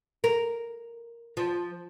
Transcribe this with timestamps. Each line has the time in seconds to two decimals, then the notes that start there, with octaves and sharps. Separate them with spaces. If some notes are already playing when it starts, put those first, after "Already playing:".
0.24 A#4
1.37 F3